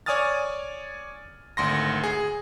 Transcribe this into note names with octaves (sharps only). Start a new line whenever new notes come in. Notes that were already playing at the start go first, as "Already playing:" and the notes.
C#5 D5 G#5 D#6 F6 A6
G#1 D2 C6 A#6
G#4